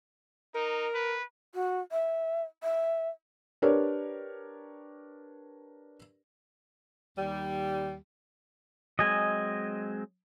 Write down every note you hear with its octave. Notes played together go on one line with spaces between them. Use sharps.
D#4 A#4
B4
F#4
E5
E5
D4 G4 A#4 B4 C#5 D5
D#2 G3
F#3 G#3 C4 D#5 G#5